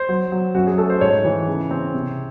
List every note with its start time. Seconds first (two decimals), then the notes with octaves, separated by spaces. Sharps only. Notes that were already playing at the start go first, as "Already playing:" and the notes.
Already playing: C5
0.09 F#3
0.32 F#3
0.55 F#2 F#4
0.67 G#4
0.78 A3 A4
0.90 C5
1.01 G#2 C#5
1.25 E3
1.48 C#3
1.71 C4
1.94 C3